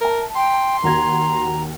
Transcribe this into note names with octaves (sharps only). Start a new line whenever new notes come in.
A#4 E5 A5
G5 C6
D#2 F#4 A#5 G#6